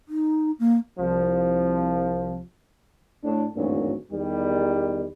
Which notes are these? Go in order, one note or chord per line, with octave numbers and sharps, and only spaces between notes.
D#4
A#3
C2 F3
A2 D4
G#1 D2 G2 A#2 E3 F#3
E2 D#3 G3